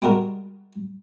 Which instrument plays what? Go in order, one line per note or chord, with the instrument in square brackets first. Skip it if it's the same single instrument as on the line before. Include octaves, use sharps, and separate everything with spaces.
[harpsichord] G3 G#3 F#4 A#4 A5